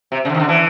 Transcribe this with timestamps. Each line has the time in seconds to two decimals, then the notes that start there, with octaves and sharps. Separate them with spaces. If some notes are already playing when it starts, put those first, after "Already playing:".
0.12 C3
0.25 C#3
0.29 D3
0.35 D#3
0.40 D3
0.49 E3